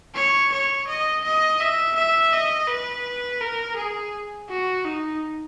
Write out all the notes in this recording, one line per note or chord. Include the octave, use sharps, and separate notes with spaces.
C#5
C#5
D#5
D#5
E5
E5
D#5
B4
A#4
G#4
F#4
D#4